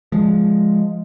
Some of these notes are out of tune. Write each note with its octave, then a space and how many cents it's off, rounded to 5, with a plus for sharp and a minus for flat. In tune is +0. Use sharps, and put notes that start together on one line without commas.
F3 +0 G#3 +0